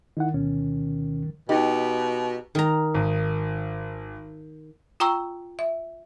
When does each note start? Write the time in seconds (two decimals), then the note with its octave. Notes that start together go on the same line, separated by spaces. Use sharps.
0.17 D#3 D#4 E4 F#5
0.34 D2 B2 C#4
1.49 B2 D#4 G4
2.55 D#3 A#5
2.94 G#1
5.00 F4 G5 A#5 C#6 E6
5.59 E5